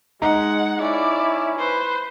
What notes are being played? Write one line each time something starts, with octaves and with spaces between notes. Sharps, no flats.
G#3 D#4 F#5 A#5
C#4 E4 D5
B4 C5